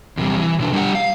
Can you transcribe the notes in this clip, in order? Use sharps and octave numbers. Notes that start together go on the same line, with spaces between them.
E2 C3 G3
E3
B2 D3 E3
G3 D4 G4 F#5
F5